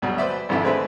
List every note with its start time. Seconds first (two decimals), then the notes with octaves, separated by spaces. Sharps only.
0.02 D2 B2 F#3 G3
0.18 B4 C5 D5 E5
0.49 G#1 F2 D3 E4 D5 E5
0.63 G#3 A3 C4 D4 B4 E5